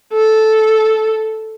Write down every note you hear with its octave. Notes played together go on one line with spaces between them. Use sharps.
A4